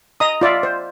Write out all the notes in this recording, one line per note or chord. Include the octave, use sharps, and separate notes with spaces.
D#5 A#5 D#6
F4 D5 E5
C5